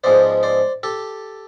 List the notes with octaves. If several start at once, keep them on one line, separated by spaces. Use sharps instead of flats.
G#2 F3 G#3 B3 C5 D5
C5 D5
G4 A4